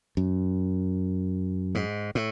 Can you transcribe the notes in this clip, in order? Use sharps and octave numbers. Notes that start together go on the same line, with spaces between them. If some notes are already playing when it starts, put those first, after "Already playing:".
F#2
G#2
A2